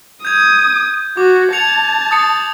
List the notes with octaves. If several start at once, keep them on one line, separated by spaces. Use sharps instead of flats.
D#6 G6 G#6
F#4 D6
A5 G#6 C#7 F7
D#6 A6 C#7